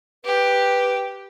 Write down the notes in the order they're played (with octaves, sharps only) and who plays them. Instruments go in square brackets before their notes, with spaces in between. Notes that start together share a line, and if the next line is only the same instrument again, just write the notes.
[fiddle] G4 [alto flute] B4